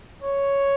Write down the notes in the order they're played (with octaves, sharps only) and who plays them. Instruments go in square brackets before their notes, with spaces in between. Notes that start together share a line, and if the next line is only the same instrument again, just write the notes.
[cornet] C#5